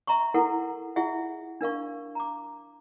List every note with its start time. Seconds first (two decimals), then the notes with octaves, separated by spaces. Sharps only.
0.07 E5 A#5 C6 C#6
0.34 E4 A4 A#4 F#5
0.96 E4 F4 G#4 E5 F#5
1.61 D4 A#4 F5 C#6
2.15 A#5 D6